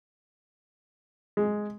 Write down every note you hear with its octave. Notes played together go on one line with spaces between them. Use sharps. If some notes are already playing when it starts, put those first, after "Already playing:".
G#3